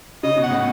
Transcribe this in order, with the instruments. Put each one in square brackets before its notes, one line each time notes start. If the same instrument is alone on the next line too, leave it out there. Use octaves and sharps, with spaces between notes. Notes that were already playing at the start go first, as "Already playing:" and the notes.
[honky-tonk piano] C#3 [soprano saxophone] D#5
[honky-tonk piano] B2
[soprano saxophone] F#5
[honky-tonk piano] A2